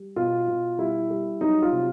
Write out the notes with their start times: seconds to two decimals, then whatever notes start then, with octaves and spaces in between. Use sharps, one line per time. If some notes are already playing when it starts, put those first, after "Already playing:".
Already playing: G3
0.16 B2 F4
0.48 B2
0.79 G3 E4
1.10 G3
1.41 F#3 D#4
1.62 F4
1.72 C3